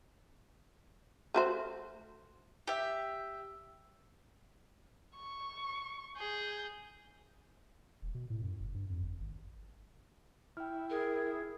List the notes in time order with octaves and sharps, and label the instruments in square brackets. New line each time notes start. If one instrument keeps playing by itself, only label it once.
[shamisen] A3 F#4 C5
[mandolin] G4 E5
[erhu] C#6
[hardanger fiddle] G#4 [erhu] G6
[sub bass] E1
B2
A2
F#2
F#1
G2
F2
G1
G#1
[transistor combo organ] E4 [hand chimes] G5 F6
[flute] G#4 [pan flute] A#4